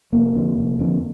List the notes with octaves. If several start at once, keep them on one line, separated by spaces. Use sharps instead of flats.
F1 A#3
F2 D3
F1
F2 D3